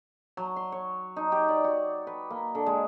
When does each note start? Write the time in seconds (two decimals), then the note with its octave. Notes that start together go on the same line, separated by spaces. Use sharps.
0.37 F#3
0.56 C6
0.72 C#5
1.16 D#4
1.32 G4
1.48 D5
1.64 F#4
2.07 B4
2.30 A#3
2.55 D3
2.66 G#3